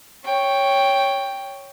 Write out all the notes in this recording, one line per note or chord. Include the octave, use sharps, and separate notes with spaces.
C#5 G5